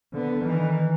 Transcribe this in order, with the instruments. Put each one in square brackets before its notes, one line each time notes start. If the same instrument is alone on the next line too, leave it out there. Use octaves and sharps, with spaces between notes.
[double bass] D3 B3
D#3 E3